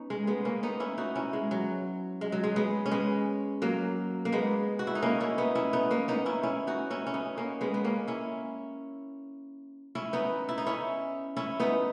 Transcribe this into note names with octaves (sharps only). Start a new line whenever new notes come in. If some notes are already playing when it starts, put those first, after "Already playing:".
Already playing: B3 C#4 D#4
G#3
G#3 B3
A#3 C#4
B3 D#4
C#4 E4
D#4 F#4
C#4 E4
G#3
F#3
G#3
F#3
G#3
G#3 B3
C#4
G#3 B3
F#3 A#3
A#3
G#3 B3
F#4
E4
D#4
A#3 C#4
C#4 E4
B3 D#4
C#4 E4
B3 D#4
A#3 C#4
B3 D#4
C#4 E4
C#4 E4
D#4 F#4
C#4 E4
C#4
B3 D#4
A#3 C#4
G#3 B3
B3
A#3 C#4
C#4 E4
C#4 E4
B3 D#4
E4
D#4
C#4 E4
C#4 E4
B3 D#4